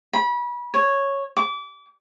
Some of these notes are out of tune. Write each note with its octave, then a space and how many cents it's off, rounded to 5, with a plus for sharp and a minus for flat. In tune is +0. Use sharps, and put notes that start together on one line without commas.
B5 -30
C#5 -5
D6 -30